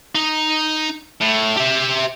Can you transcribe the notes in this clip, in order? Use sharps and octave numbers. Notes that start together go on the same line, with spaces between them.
D#4
A2
G4 E5